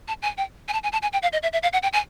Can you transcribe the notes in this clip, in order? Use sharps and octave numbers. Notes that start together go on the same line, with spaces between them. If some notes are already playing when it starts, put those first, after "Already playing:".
A5
G#5
G5
G#5
A5
G#5
A5
G#5
G5
F5
D#5
E5
E5
F5
F#5
G5
G#5